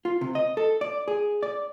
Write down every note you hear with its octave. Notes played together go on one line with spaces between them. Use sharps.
F4
C3
D#5
A4
D5
G#4
D5